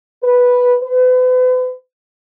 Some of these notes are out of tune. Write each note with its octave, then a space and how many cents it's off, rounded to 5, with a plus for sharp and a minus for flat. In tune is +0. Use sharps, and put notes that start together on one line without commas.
B4 -5
B4 +40